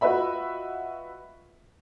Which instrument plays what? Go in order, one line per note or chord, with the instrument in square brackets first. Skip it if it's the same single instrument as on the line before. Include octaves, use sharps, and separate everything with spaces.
[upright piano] F4 F#4 B4 D#5 E5 B5